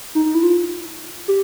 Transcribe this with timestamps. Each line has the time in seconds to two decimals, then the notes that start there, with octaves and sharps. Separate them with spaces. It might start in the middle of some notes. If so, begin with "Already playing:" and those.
0.15 D#4
0.25 D#4
0.35 E4
0.43 F4
1.28 G4